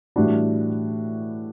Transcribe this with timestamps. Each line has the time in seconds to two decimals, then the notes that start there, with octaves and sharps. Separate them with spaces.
0.16 A2 E3 G3 D4 F#4